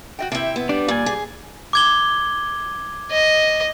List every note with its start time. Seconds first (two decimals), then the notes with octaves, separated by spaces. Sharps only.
0.19 F#4 D#5 G5
0.32 C3 E4 E5 G5
0.56 B3
0.69 G3 D4
0.88 A#2 D5 G#5
1.06 G#4
1.73 D6 G#6 G7
3.11 D#5